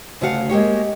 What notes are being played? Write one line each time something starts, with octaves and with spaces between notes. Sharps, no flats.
D2 C#3 A3 F#4 F5 F#5
G#3 A#3 G4 C#5